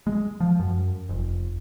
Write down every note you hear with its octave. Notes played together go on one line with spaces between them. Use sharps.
G#3
F3
F#2
F1